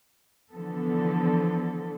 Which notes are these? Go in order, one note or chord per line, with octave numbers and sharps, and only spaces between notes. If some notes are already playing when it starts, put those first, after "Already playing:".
D3 E3 F3 B3 A4